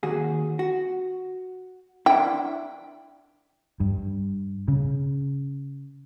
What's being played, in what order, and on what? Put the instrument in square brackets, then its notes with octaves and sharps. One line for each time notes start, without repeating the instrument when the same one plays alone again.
[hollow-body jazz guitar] D#2 F#4 G#4
F#4
[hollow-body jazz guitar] D4 E4 [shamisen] G5
[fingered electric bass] G2
C#3